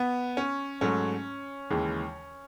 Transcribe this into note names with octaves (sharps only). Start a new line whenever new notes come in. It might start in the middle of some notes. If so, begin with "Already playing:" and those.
Already playing: B3
C#4
G#2 F#3 A3 C#4
D#2 C#3 E3 G#3